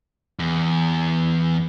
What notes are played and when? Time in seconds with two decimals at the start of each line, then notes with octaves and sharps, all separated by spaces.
0.39 E2